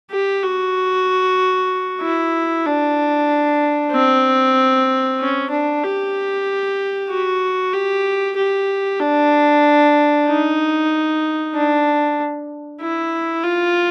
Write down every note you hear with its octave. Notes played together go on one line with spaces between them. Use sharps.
G4
F#4
E4
D4
C4
C#4
D4
G4
F#4
G4
G4
D4
D#4
D4
E4
F4